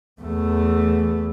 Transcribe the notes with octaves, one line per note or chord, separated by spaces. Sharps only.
E2 A3